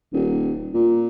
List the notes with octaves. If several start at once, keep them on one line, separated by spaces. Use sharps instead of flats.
D#1
A#2